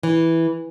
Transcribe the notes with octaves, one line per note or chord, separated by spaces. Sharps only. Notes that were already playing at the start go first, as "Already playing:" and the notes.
E3